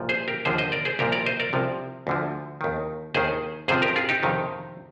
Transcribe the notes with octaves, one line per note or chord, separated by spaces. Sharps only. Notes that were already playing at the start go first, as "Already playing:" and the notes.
Already playing: C2 A#2 F3
G#4 C5
G4 A#4
D#2 D3 F3 G#4 C5
C5 D#5
A#4 D5
G#4 C5
C2 A#2 F3 G4 A#4
A#4 D5
C5 D#5
A#4 D5
C2 C3 F3
D2 D3 F3
D#2 D#3
D#2 D#3 G#4 C5
F2 C3 F3 G#4 C5
G4 A#4
F4 G#4
D#4 G4
F2 C3 D#3